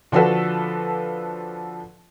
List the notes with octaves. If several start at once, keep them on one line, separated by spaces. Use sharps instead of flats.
D3 F3 D4 F#4 A4 B4